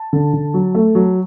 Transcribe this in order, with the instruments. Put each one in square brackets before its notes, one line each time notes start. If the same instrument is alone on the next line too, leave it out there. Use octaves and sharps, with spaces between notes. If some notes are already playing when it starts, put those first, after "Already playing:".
Already playing: [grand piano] A5
D3
D3
F#3
A3
F#3